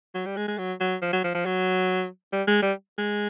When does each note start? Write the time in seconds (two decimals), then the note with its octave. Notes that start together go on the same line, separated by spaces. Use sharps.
0.15 F#3
0.26 G3
0.37 G#3
0.48 G#3
0.58 F#3
0.80 F#3
1.02 F3
1.13 F#3
1.24 F3
1.35 F3
1.45 F#3
2.32 G3
2.48 G#3
2.62 G3
2.98 G#3